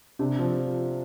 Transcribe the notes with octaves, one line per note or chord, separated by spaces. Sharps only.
C3 D4
F3